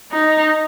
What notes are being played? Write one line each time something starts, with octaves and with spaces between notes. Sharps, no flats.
D#4